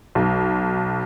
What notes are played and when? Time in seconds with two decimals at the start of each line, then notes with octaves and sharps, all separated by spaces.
0.15 B1